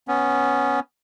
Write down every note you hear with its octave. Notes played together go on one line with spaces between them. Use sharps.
B3 C#4